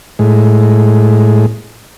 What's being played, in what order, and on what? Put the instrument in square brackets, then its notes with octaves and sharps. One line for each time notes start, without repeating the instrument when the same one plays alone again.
[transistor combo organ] A2 G#3